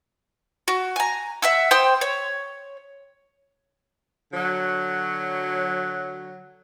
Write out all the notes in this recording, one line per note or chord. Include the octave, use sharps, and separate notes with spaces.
F#4
G#5 A#5
E5 F#5 E6
C5 G5 C6 D#6
C#5
D3 F#3